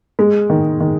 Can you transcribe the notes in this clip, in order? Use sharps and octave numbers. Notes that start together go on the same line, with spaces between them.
G#3
D#3
D#3